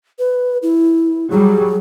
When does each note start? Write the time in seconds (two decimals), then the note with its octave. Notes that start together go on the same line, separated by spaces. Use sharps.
0.19 B4
0.63 E4
1.31 F#3 G3 G#4